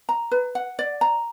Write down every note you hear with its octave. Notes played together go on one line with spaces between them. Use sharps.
A#5
B4
F#5
D5
A#5